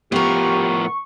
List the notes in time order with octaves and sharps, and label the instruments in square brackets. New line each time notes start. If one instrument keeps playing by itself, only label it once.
[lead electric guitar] A2 F3 [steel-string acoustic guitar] B3 A#4 [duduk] G4 [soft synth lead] C#6